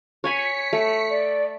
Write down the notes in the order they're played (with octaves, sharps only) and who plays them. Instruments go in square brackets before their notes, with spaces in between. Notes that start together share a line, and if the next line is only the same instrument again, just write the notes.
[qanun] C#5 G#5 B5 [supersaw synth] B6 C#7
[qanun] A3
[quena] D5